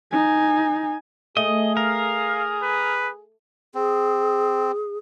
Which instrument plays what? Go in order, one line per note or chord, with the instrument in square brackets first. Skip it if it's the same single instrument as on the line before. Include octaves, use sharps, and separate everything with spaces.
[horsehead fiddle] D#4 G#5
[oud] A3 [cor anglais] G#4 [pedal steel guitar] D#5
[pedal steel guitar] A#4 [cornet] F5
[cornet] B4
[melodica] C4 [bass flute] G#4